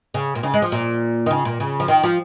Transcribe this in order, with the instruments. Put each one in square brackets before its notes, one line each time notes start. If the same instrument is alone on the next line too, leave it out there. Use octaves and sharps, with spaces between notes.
[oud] C#3
A#2
C#3
G#3
F3
A#2
D#3
C#3
A#2
C#3
F3
D#3
F3